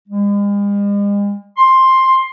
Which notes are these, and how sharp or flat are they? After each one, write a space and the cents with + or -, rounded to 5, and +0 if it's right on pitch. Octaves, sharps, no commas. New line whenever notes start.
G#3 -45
C6 +10